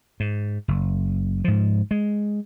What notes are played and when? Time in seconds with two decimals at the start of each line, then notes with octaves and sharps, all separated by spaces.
0.20 G#2
0.68 F#1
1.45 G#2 F3
1.91 G#3